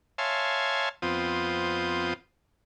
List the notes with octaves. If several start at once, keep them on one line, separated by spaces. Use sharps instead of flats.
C#5 E5 F5 G#5 A5 C6
F2 B3 C4 F4 G5 D#6